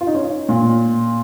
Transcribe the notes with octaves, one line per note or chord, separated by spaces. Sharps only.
F4
D#4
C#4
A#2